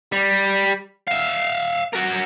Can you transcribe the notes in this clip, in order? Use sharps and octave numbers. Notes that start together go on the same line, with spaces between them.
G3
E5 F5
F#4 A#4